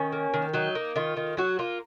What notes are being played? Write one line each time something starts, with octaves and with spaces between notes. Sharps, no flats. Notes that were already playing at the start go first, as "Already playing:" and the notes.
Already playing: D#3 C#4
A#3
D#3
F#3 D#4
A#3
D#3 F4
D#3
F#3 F#4
A#3 F4